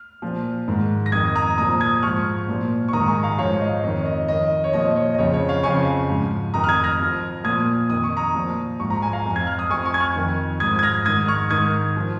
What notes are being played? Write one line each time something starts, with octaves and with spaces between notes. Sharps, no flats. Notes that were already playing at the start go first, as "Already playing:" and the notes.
Already playing: F6
A#2 F3
G#2 D#3
A#6
F2 D#3 D#6 G#6
A#5 D#6
A#2 F3 A#5 D#6
D#6 G#6
G#2 F3 C#6 F6
A#2 F3
C#6
G#2 D#3 A#5 D#6
G#5 C#6
F5 A#5
G#2 F3 C#5 F5
D#5
F2 D#3 C#5
D#5
F2 D#3 D#5
C#5
A#2 F3 D#5
C#5
D#5
F2 C#3 F3 C#5
C#5
C#5 F5
F2 C#3 F3 G#5 C#6
G#2 F3
F2 D#3 A#5 D#6
F6
D#6 G#6
F6 A#6
F2 F3
A#2 F3 D#6 G#6
F2 D#3 D#6
C#6
A#5 D#6
A#2 F3
G#2 F3 C#6
A#5
G#5
F5 A#5
F2 F3
G#6
F6
D#6
F2 F3 G#5 C#6
G#5 C#6
G#6
C#6 F6
F2 D#3
G#2 F3 D#6 G#6
G#6
F6 A#6
G#2 D#3 D#6 G#6
C#6 F6
G#2 D#3 D#6 G#6
F3